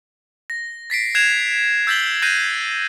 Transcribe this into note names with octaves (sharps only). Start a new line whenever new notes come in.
A#6
A6 B6 C7 D7
F#6 G#6 C7 E7 F7
E6 G6 A6 B6 F#7 G7
F#6 G6 A6 A#6 C7 D#7